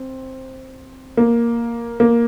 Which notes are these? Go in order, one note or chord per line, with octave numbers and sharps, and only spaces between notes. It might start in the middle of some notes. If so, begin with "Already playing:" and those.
Already playing: C4
A#3
A#3